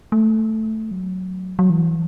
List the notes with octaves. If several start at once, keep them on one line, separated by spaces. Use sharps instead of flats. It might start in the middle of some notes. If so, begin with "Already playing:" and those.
A3
F#3
F#3
E3